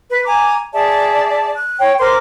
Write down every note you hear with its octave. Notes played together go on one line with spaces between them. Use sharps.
B4
G#5 A#5 D6
G#4 D5 E5 A5
F#6
C#5 G5 C#6
A#4 C5 C6 D6